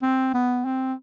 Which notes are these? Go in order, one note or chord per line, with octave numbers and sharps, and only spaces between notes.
C4
B3
C4